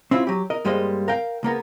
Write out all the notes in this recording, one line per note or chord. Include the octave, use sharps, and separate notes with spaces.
C4 C#4 E4 F4
F#3 G4
A#4 D#5
G2 G3 G#3 A#3 C5 D#5
A#4 F5 G5
C#2 A#3 B3 A#4